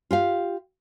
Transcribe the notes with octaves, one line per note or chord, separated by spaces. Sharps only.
F4 G4 F5